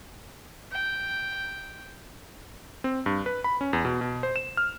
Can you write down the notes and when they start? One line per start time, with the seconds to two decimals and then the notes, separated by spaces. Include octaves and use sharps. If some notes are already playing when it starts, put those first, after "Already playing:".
0.72 G5
2.84 C4
3.06 G2
3.26 B4
3.44 B5
3.61 C#4
3.73 E2
3.85 B2
4.01 B2
4.23 C5
4.36 E7
4.57 F6